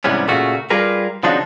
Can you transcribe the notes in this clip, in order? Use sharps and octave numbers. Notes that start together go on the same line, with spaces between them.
G#2 C3 E3 G3 B3 C#4
A#2 C#3 A3 F4 F#4
G3 F4 G#4 A#4 B4
C#3 F3 C4 D4 D#4 F#4